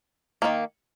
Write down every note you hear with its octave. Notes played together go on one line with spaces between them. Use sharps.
D#3 G3 A#3